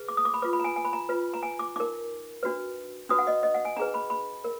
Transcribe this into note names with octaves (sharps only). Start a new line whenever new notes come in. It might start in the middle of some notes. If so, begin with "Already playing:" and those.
Already playing: G#4 B4
D6
D#6
D6
B5
F4 B4 D6
B5
A#5
G#5
G#5
B5
A#5
F4 B4
A#5
G#5
D6
D#4 A#4 D6
D4 F#4 B4
D4 F#4 B4 D#6
F#5
D#5
D#5
F#5
G#5
D4 G#4 B4 A#5
B5
B5
A#4